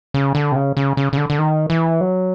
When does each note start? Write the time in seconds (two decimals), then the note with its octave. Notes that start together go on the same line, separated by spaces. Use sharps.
0.14 C#3
0.35 D3
0.52 C3
0.56 C#3
0.77 C#3
0.97 C#3
1.13 C#3
1.17 D3
1.30 D3
1.39 D#3
1.70 E3
2.01 F#3